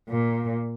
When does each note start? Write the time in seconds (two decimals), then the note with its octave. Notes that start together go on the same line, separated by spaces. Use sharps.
0.09 A#2